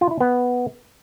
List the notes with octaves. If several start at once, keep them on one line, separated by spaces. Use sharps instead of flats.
F4
E4
B3